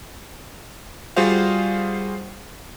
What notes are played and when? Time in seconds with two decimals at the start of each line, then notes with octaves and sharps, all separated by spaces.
1.16 G3 F4 F#4 G#4 C5 F5